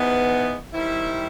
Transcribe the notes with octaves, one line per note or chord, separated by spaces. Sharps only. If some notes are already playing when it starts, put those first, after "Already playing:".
Already playing: G#2 E3 G#3 B3
D#3 G3 C4 E4